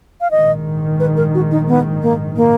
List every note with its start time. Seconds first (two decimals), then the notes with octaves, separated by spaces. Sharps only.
0.21 F5
0.31 A#1 G#2 D#3 D#5
1.00 B4
1.17 A#4
1.34 F#4
1.51 D#4
1.68 B3
2.02 A#3
2.36 A#3